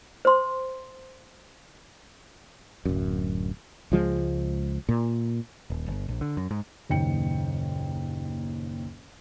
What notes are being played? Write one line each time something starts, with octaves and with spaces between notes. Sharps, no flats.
C5 C6
D1 F#2
C#2 F3 G#3
A#2
D#1
G1
A#1
D3
F#2
G#2
F#1 D#2 A#2 G5 C#7